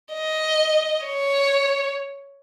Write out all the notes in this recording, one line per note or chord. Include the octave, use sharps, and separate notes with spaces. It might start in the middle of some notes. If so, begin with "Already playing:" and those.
D#5
C#5